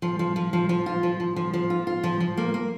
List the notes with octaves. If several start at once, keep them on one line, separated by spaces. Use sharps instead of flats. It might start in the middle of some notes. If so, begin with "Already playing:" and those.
F3
F3
F3
F3
F3
F4
F3
F3
F3
F3
F4
F4
F3
F3
A#3
A#3